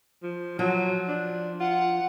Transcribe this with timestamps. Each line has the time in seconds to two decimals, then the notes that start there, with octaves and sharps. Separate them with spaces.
0.23 F3
0.59 F3 F#3
1.08 D4
1.60 F4 F#5